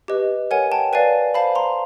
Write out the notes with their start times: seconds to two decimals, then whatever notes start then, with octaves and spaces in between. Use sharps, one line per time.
0.08 G4 B4 D#5
0.51 A#4 C#5 F#5 G#5
0.72 G5 A5
0.93 B4 D5 F5 G#5
1.34 C5 F5 A5 B5
1.55 A#5 C6